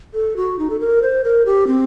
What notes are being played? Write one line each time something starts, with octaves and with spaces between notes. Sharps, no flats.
A4
F#4
D#4
A4
A#4
C5
A#4
G4
C4